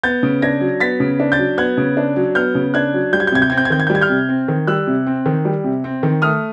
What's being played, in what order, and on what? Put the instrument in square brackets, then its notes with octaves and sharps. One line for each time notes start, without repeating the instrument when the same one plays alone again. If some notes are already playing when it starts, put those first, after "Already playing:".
[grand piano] B3 G6 A6
C#3
D4 G#6 A#6
F#3
B3 A6 B6
C#3
D4
G6 A6
F#3
B3 F#6 G#6
C#3
D4
F#3
B3 F6 G6
C#3
D4 F#6 G#6
F#3
G3 G6
G#6
G6
C3 G#6
G6
C4 G#6
G6
G#6
D#3 G6
G#6
G6
G3
G#6
F6 G6
C3
C4
D#3
G3 E6 F#6
C3
C4
D#3
G3
C3
C4
D#3
A3 D#6 F6